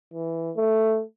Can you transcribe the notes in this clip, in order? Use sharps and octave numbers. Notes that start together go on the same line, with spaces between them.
E3
A3